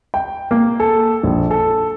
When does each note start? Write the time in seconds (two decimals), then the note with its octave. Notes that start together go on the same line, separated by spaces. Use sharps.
0.14 G5
0.51 A#3
0.80 A4
1.24 A#1
1.51 A4